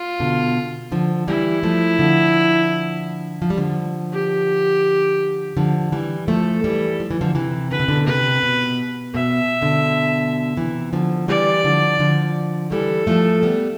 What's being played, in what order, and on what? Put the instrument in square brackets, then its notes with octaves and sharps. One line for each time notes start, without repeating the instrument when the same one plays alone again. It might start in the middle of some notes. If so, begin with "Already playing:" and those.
Already playing: [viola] F4
[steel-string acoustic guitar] B2 D3
D3 F3
[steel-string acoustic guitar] E3 G3 [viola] E4
[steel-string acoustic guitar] F3 A3
D3 F3
F3
G3
D3 F3
[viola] G4
[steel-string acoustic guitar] D3 F3
E3 G3
[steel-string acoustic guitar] F3 A3 [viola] A4
[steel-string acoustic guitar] E3 G3
F3
E3
D3 F3
C3 E3
[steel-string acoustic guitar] D3 [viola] B4
[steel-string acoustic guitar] C3
B2 D3
[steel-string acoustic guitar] C3 [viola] B4
[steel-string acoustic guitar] B2
[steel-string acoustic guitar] B2 [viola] E5
[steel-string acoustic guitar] B2 D3
C3 E3
D3 F3
[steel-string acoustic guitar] E3 G3 [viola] D5
[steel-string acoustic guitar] D3 F3
D3 F3
[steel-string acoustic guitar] E3 G3 [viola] A4
[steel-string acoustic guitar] F3 A3
G3 B3